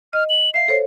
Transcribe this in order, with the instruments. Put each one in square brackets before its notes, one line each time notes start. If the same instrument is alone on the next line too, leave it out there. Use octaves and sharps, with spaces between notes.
[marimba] D#5 [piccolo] F6
[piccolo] F#7
[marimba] E5 F5 [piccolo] C7
[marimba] A4 C5 C#5